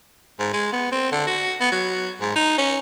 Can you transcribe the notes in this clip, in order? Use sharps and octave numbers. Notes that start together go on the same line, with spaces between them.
G#2
G#3
B3
C4
D3
F#4
B3
F#3
G#2
D#4
C#4